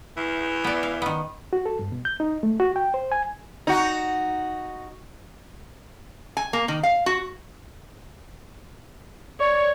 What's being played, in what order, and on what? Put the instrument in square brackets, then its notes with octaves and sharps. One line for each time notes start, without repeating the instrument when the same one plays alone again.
[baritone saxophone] E3
[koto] B3 D5
F5
D#3 B3
[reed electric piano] F#4
A4
G2
B2
G6
D#4
A3
F#4
G5
C5
G#5
[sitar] D#4 F#4
[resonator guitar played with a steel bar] G#5
A#3
D#3
F5
F#4
[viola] C#5 [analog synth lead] D5